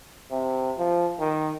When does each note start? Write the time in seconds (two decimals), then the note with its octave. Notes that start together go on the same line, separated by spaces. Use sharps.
0.31 C3
0.78 F3
1.19 D#3